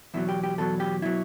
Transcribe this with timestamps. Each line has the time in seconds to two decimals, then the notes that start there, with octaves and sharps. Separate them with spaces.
0.14 E2 B2 F#3 E4
0.29 G4
0.43 G4
0.58 E2 B2 F#3 A4
0.80 G4
1.02 B2 F#3 E4